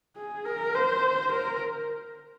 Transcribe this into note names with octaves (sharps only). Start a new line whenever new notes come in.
G#4
A#4
C5
A#4